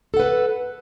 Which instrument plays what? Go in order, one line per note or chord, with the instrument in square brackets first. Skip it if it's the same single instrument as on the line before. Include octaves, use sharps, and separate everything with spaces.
[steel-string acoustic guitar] A4
F#5
B4